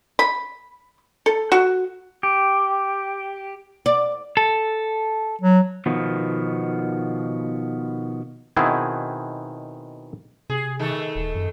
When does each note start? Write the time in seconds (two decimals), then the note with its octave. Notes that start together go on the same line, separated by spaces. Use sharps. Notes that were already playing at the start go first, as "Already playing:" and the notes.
0.19 B5
1.26 A4
1.52 F#4
2.23 G4
3.86 D5
4.37 A4
5.42 F#3
5.86 B2 D#3 F3 B3
8.56 B2 D#3 B3 C4 E4 G#4
10.50 C3 G#4
10.79 D#3 A3 A4
11.16 D#1
11.35 F#2